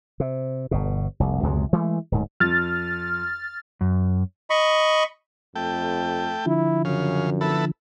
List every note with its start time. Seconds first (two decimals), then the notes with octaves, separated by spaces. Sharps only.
0.20 C3
0.71 G1 B2
1.20 F1 C2
1.43 C#2 F#2 C3 G#3
1.73 E3 G#3 A3
2.12 D1 G#2
2.40 F2 F6 A6
3.81 F#2
4.50 D#5 B5 C#6
5.55 F2 A3 G5
6.46 D3 F3 E4
6.85 F#2 C#3 F5
7.41 B3 E4 A4